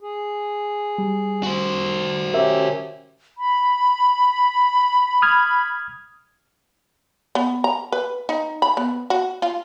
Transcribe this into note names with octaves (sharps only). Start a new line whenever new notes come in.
G#4
G3
F#4 C5
C#4 G4 A#4 E5
B5
D#6 F6 G#6
B3
A#5
B4
D#4
B5
B3
F#4
F4